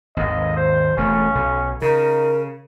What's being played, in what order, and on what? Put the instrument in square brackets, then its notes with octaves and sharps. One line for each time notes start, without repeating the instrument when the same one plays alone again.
[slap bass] G#1 D#2 [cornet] D#5
[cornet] C5
[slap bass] E1 A3 [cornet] C#4
[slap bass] B1
[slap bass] C#3 [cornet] D#4 [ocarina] A#4